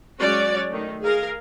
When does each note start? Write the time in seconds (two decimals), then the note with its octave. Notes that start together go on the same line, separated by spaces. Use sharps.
0.19 F#3 G#3 C#4 F#4 C#5 D5
0.69 D#3 A3
1.02 G#4 A#4 F5